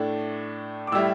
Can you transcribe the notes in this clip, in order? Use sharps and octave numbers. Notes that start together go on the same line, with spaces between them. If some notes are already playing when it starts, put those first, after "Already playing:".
Already playing: A2 A3 D4
D6
A2 G3 E4 E6